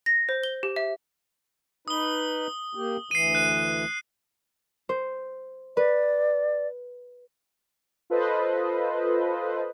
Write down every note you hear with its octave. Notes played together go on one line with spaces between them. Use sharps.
A#6
C5
G7
G4
E5
D#4 B4 D#6 G7
A#3 G4
D2 E3 C7 D#7
F#6 D#7
C5
B4 D5
F4 A4 B4 C5 D#5